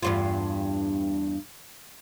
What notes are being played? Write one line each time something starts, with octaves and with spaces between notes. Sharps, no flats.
E2 G2 F4